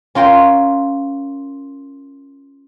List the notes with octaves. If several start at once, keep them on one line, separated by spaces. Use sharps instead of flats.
C#4 F4 A#4 G5 A#5 C6